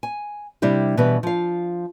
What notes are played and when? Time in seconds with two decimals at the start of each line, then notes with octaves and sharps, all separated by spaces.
0.03 G#5
0.62 C3 G3 D4 E4 G4
0.97 B2 E3 G3 B3
1.23 F3 F5